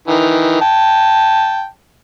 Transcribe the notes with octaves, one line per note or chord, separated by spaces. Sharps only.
D#3 E3
G5 A5